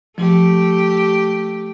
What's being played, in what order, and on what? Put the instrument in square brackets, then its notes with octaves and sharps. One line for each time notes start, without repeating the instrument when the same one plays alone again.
[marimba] F3 [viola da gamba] A3 G4